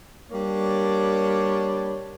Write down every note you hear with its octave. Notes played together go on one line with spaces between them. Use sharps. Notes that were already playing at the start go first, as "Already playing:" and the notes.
G3 A#3 D4 C#5